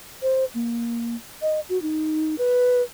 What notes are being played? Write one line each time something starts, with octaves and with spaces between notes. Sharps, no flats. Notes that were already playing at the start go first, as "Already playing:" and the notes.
C5
A#3
D#5
F#4
D#4
B4